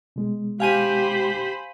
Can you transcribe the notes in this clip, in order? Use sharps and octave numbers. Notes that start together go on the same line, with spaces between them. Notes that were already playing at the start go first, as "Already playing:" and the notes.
B2 G#3
G4 C5 F5 G#5 B5 D#7